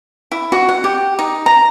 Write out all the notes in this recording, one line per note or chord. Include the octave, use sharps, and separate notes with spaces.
E4
F#4
F#5
G4
D#4
A#5